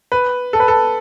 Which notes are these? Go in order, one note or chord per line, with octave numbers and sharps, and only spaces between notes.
B4
A4
B4
A4